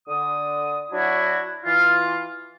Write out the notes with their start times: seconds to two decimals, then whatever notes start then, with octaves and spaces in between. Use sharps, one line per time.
0.08 D3 D#6
0.92 F#3 D4 E4 F#4
1.64 E3 F4